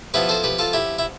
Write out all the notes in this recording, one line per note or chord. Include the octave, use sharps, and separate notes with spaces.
F3 B3 E4 G4 B4
A4 C5
G4 B4
F4 A4
E4 G4
E4